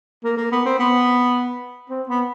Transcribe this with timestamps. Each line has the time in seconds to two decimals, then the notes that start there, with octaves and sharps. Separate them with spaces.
0.24 A#3
0.37 A#3
0.52 B3
0.65 C4
0.79 B3
1.90 C4
2.08 B3